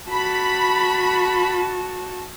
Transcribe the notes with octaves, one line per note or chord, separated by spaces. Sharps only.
F#4 A5 B5